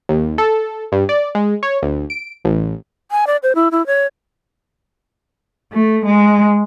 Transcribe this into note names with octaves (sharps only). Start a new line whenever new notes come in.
D#2
A4
G2
D5
G#3
C#5
D2
D7
A1
G#5
D5
C5
E4
E4
C#5
A3
G#3